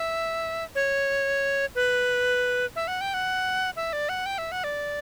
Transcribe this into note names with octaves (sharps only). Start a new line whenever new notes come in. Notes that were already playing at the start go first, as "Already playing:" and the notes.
Already playing: E5
C#5
B4
E5
F#5
G5
F#5
E5
D5
F#5
G5
E5
F#5
D5